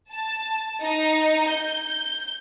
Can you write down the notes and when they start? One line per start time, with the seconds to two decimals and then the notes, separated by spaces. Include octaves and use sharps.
0.12 A5
0.83 D#4
1.49 G6